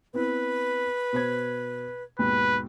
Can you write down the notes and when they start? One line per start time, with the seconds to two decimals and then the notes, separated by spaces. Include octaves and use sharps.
0.14 B3 C4 E4 B4
1.13 B2 C5 G#6
2.19 D#2 G#2 B2 B4